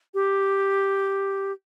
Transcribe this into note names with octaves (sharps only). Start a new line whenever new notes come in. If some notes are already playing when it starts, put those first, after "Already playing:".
G4